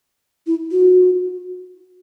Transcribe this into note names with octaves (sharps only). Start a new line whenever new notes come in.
E4
F#4